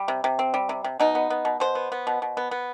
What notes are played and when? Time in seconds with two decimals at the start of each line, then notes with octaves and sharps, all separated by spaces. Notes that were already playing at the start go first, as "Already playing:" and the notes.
Already playing: G3
0.08 C3
0.24 C3
0.39 C4
0.54 G3
0.69 C3
0.84 C3
1.00 B2 D#4
1.15 B3
1.30 B3
1.45 B2
1.60 B2 C5
1.75 B3
1.92 B3
2.07 B2
2.22 B2
2.37 B3
2.51 B3